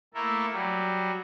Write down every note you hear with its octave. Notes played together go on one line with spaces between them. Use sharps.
A3 A#3 E4 A4 A#4
F#3 G3